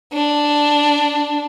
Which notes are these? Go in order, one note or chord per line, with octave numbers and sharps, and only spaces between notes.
D4